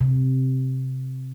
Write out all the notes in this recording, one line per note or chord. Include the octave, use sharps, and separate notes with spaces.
C3